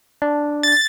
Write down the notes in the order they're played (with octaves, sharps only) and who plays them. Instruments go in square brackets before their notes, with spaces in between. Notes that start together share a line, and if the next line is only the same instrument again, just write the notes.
[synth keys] D4
[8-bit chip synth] A6